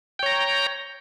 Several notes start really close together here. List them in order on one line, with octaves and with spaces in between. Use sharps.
G5 C#5 A#5